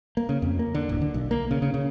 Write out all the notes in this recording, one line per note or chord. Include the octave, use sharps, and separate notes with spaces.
A#3
C#3
F2
A#3
D3
D1
D3
B1
A#3
C#3
C#3
C#3